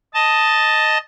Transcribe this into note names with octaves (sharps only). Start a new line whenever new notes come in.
D#5 A5